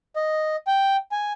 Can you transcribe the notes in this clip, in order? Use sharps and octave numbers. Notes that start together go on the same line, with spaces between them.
D#5
G5
G#5